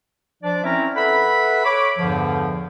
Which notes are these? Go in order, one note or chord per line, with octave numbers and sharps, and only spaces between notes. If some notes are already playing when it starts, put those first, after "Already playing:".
F3 D4 D5
C4 C#4 E4 A#4 E5 A#5
A4 B4 E5 F#5 B5
C#5 B5 D6
E2 G2 D3 F3